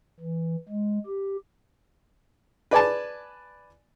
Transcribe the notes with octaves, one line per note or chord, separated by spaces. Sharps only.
E3
G#3
G4
B4 D5 G#5 A5